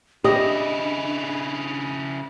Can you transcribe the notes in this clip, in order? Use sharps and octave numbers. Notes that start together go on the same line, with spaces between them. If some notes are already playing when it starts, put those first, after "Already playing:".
C#3 D4 E4 G4 D#5